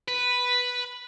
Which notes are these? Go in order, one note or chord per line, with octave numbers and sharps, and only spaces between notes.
B4